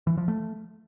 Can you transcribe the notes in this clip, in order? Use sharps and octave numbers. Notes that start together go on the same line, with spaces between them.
E3
F3
A3